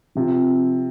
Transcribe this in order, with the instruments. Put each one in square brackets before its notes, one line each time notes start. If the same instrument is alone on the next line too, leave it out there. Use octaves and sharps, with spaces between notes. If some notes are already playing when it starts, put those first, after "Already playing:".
[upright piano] C3 [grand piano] F3 C4 F4